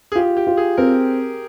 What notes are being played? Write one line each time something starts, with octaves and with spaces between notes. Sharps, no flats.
G#4
F4 G4
G4
F4
G#4
C4 A#4